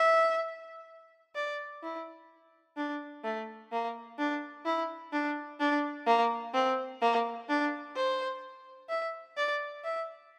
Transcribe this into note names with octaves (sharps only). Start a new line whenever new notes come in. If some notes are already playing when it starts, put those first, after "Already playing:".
Already playing: E5
D5
E4
D4
A3
A#3
D4
E4
D4
D4
A#3
C4
A#3
D4
C5
E5
D5
E5